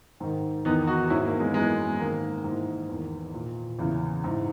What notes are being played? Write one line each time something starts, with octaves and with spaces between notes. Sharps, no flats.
G#2 D#3
E2 D#3 B3 D#4
D#4 F#4
G#2 E3 C#4 E4
A#3
G#3 B3
F#2 E3 G#3 B3
G#2 D#3 A#3
G#2 E3
E2 D#3
A#2
E2 C#3 E3
G#2 E3